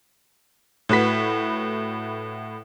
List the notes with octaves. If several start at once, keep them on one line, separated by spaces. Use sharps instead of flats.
A2 F#4 B4 B6